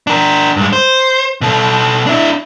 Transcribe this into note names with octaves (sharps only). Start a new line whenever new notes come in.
D4 A#4
G2 G#3
C5
B2 A4
D4 E4